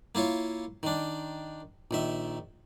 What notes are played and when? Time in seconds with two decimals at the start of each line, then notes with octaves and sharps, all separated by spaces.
0.15 A#3 E4 F4 C#5
0.83 D#3 D4
1.91 A#1 D#3 E5